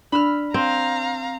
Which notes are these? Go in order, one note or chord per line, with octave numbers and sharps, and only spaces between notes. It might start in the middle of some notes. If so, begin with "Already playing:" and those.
D4 B5 E6 F6
C4 F5 A#5